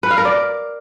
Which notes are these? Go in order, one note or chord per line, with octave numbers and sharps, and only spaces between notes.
B4
F5
A#4
D5